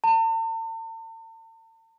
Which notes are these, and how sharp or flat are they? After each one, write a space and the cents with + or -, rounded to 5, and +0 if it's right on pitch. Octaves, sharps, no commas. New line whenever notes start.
A5 +45